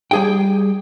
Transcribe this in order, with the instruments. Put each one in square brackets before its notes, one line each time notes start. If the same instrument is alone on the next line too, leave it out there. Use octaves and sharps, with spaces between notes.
[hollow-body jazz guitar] G3 G#4 G5